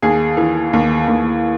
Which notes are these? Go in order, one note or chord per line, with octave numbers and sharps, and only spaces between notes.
D#2 G#4
E3
D#2
D#2